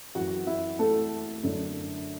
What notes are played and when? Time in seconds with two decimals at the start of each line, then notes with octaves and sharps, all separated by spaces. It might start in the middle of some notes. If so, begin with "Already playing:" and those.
0.15 F#2 E3 F#4 F#5
0.47 E4 E5
0.79 A3 A4
1.43 F#2 D3